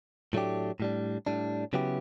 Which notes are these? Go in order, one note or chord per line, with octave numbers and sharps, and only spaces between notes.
A2 F#3 A3 D4 G4
A2 G3 D4
A2 G3 D4
C#3 F#3 B3 E4 G4